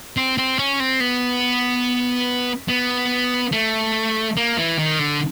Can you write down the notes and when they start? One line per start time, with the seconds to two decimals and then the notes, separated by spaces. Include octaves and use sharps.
0.17 C4
0.38 C4
0.59 C#4
0.80 C4
1.00 B3
2.68 B3
3.52 A3
4.37 A#3
4.57 E3
4.78 D#3
4.99 D3